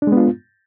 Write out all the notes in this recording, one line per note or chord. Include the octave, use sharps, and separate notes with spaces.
G#3 B3 D4 F4